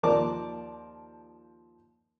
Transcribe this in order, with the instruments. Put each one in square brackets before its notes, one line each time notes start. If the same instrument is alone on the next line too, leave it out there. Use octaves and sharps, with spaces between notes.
[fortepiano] D#2 F3 A#4 D5 A5 D6